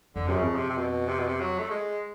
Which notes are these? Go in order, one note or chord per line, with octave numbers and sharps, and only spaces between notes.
F2 D3
F#2 C3
C#3
F2
C3
C3
B2
C3
B2
C3
F#3
A3
G#3